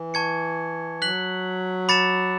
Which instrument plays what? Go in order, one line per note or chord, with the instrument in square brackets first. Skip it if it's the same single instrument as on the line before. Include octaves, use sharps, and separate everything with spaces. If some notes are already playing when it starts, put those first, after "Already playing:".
Already playing: [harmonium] E3
[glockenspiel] A5 C#6 G#6 C#7
[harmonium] F#3 [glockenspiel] F#6 B6 F#7
[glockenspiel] B5 D6 A6 C#7 E7